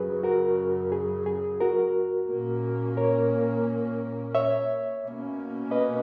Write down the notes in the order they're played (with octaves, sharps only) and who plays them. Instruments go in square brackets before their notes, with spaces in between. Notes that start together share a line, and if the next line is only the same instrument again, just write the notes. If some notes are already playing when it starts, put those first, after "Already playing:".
Already playing: [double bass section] F#2 C#3 F#3 [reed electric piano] G#4 B4
[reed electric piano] F#4 A#4
G#4
G#4
F#4 A#4
[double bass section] A#2 A#3 C#4
[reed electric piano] A#4 C#5
C#5 E5
[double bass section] B2 A#3 C#4
[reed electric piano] B4 D#5